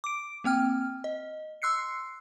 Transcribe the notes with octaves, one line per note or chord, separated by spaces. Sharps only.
D6 D7
A#3 C4 G5 F6
D#5
C6 E6 F#6 C7 C#7